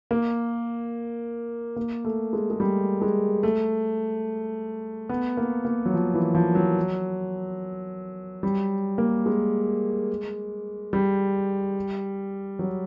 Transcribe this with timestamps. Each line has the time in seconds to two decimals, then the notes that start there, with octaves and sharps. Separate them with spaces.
0.11 A#3
1.76 A#3
2.05 A3
2.33 G#3
2.50 G#3
2.60 G3
3.02 G#3
3.43 A3
5.09 B3
5.37 A#3
5.65 A#3
5.86 F#3
5.94 F3
6.14 E3
6.35 F3
6.55 F#3
8.43 G3
8.98 A#3
9.26 G#3
10.93 G3
12.59 F#3